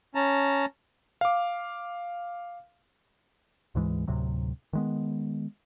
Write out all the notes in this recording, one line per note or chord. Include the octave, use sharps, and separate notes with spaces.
C#4 A5 A#5
F5 D6
D2 G#2 E3 G#3
D2 A2 C3 F#3
D#3 G#3 B3